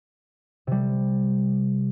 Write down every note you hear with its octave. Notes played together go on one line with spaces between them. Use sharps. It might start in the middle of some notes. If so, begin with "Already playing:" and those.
C3 G3